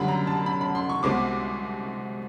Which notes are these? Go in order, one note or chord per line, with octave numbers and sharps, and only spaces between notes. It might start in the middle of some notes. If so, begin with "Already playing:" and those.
Already playing: F#2 D3 G3 B5
A#5
A5
B5
B5
C6
C#6
C2 B2 G#3 C4 D6